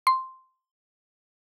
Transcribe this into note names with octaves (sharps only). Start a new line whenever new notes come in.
C6